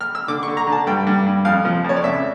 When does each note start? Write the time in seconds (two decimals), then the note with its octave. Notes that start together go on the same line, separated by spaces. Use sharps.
0.01 F6
0.15 E6
0.28 D3 D6
0.43 C#6
0.48 D3
0.57 A#5
0.67 D3
0.72 A5
0.87 G2 G5
1.07 G2
1.26 G2
1.45 F2 F5
1.65 F3
1.84 F2 C#5
1.96 D5
2.04 C#2 E5